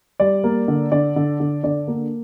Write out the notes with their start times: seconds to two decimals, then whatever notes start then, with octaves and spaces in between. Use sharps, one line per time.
0.20 G3 D5
0.44 A#3
0.68 D3
0.92 D3 D5
1.16 D3
1.40 D3
1.64 D3 D5
1.88 A#3